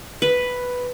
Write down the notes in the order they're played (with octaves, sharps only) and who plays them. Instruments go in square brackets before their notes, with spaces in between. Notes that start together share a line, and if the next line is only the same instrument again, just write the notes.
[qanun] B4